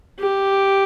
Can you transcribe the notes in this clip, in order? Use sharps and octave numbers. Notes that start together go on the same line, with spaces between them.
G4